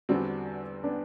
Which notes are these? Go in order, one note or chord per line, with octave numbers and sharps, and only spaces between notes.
E2 D3 G3 C4 D4 F#4
B3 D4